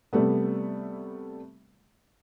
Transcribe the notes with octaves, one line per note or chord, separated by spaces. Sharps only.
C3 G3 A3 B3